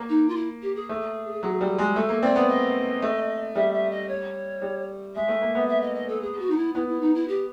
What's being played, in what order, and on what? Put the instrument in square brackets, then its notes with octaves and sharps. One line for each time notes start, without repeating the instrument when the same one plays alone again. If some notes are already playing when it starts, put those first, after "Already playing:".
Already playing: [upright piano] A#3
[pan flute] D#4
F4
E4
G4
G#4
[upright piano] A3
F#3
G3
G#3
[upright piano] A3 [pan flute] A4
[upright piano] A#3
[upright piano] C4 [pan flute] D5
[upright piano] B3
[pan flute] D#5
[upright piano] A3
[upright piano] G3 [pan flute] E5
[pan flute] E5
D#5
C#5
[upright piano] G3
[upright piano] G#3 [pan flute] E5
[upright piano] A3
A#3
B3
[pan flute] E5
D#5
D#5
A4
G#4
F#4
D#4
E4
[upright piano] B3 [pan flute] E4
[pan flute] E4
D#4
E4
G4